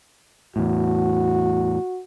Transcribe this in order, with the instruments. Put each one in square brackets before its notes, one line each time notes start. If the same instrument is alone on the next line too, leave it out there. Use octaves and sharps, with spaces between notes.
[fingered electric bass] E2 A2 [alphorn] F#4